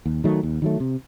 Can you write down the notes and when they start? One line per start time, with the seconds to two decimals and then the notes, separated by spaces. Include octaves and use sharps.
0.06 D#2
0.24 D#3 F#3 A3
0.43 D#2
0.62 D#3 F#3 A3
0.80 C3